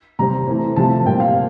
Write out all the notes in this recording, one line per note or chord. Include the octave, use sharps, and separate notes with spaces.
C3 G3 C4 A#5
E3 A3 C4
C3 F3 A3 C4 A5
A#2 G3 C4 G5
F5